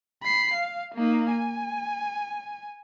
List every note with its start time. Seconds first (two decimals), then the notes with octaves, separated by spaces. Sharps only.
0.23 B5 C7
0.54 F5
0.95 A#3 D#4
1.31 G#5